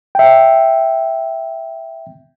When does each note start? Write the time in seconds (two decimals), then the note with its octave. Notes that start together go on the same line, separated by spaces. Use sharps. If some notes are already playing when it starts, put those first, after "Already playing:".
0.15 E5 G5